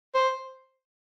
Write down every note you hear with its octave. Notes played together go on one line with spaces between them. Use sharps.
C5